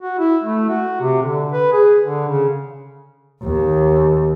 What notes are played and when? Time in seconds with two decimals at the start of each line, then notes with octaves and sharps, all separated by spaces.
0.01 F#4
0.19 E4
0.43 A3
0.69 F#4
1.01 C3
1.22 D3
1.52 B4
1.72 G#4
2.02 D3
2.28 C#3
3.44 D#2